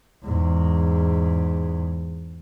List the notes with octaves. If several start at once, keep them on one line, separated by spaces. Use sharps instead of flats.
E2 G#2